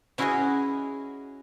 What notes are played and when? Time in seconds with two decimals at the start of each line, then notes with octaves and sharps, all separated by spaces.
0.18 C#4 E4 F#4 G#4 C#5 D#5